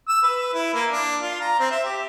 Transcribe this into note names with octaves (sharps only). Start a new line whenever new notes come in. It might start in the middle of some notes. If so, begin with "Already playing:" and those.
E6
B4
E4
A#3
D4
F4
A#5
C4
E5
G4